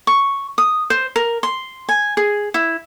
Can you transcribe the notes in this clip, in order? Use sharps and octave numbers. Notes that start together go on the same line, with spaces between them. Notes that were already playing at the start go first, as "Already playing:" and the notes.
C#6
D#6
C5
A#4
C6
G#5
G#4
E4